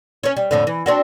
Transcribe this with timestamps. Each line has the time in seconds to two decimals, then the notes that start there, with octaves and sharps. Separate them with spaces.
0.23 C#4 C#5
0.37 G3
0.51 F2 A2 D3
0.67 E3
0.86 C4 D4 F#4